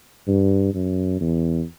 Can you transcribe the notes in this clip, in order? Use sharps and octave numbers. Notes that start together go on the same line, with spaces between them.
G2
F#2
E2